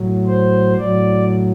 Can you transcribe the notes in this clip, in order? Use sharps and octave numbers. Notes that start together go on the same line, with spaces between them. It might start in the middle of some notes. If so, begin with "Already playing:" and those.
Already playing: A2 F#3
C5
A2 F#3 D5